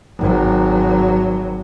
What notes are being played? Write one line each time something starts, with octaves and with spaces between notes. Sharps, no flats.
G#1 F#3